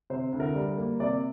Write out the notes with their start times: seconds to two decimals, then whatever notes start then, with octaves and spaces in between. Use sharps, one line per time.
0.10 C3 C5
0.32 D2
0.40 A#4
0.55 G3
0.78 A#3
1.00 C3 D5